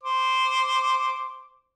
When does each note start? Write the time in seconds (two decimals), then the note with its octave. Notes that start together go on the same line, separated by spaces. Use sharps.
0.03 C5 D6